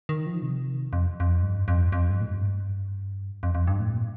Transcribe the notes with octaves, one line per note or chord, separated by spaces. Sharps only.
D#3
F3
C3
F2
F2
G2
F2
F2
G2
A2
G2
F2
F2
G2
A2
A#2